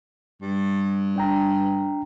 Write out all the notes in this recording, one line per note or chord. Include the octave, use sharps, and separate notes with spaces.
G2
D4 G5 A#5